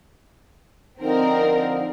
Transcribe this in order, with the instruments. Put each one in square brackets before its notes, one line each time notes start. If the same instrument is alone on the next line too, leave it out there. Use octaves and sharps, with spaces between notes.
[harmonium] D3 F3 [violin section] C4 A#4 [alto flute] D#4